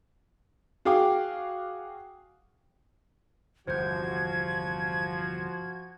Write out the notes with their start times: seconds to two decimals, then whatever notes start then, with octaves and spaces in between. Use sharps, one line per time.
0.85 F#4 G#4 F5 G5 D6
3.67 G1 E2 C3 F3 F#4 C5 G6 G#6